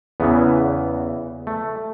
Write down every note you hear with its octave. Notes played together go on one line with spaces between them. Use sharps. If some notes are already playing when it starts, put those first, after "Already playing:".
E2 C#3 E3 B3
A3